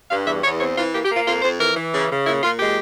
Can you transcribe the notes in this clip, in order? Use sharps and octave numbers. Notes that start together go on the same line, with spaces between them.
G2 F5
E2 E5
E2 C#5
C4 C#5
E3 F4
A#3 G4
G4
A#3
F4
F2 F4
F2 C5
E3 A#4
E3
C#3
C#3
A#2 E4
A#2 F4
G#3 G4